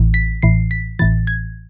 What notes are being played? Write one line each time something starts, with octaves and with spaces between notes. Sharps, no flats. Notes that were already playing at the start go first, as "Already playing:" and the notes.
Already playing: A1 A2 E3
B6
A1 A2 E3 C7
B6
A1 A2 E3 A6
G#6